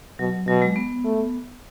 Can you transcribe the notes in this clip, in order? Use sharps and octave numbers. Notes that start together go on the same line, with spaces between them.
B2 F#3
B2 F#3
G#3
B3
A3